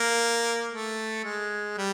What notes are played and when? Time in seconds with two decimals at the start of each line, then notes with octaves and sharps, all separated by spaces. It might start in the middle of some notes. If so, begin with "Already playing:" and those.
Already playing: A#3
0.71 A3
1.24 G#3
1.77 G3